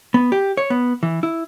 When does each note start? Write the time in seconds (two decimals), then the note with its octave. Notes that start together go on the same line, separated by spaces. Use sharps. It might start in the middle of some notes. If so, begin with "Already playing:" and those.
0.14 B3
0.32 G4
0.57 C#5
0.70 B3
1.03 E3
1.23 E4